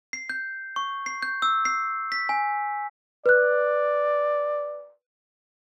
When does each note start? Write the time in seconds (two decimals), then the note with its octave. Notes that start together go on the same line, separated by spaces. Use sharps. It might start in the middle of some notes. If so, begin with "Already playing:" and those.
0.13 C7
0.30 G6
0.76 C#6
1.06 C7
1.22 G6
1.42 E6
1.65 C7
2.12 B6
2.29 G#5
3.26 B4 D5 F#6